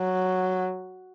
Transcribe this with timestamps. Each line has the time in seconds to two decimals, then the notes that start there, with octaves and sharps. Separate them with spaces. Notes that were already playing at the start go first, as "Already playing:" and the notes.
Already playing: F#3